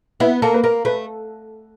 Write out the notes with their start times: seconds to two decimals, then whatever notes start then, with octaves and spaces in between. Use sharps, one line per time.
0.20 B3 E4
0.42 A#3 A4
0.54 B4
0.64 A#3 A#4
0.85 A3 B4